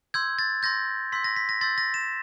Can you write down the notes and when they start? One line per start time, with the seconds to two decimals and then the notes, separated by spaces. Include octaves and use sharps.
0.14 C6 E6 G6 G#6
0.39 A6
0.63 C6 E6 G6 A#6
1.12 C6 E6 G6 B6
1.24 A#6
1.36 B6
1.49 A#6
1.61 C6 E6 G6 A6
1.78 A#6
1.94 E7